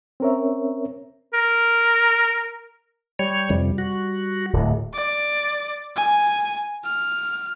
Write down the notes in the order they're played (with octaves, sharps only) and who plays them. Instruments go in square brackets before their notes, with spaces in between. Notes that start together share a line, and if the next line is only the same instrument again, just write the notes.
[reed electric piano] C4 C#4 A#4 C#5 E5
[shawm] A#4
[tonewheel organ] G3 C#5
[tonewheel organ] F2 C3 [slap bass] G3
[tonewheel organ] F#4
[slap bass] D1 A2
[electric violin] D5
G#5
F6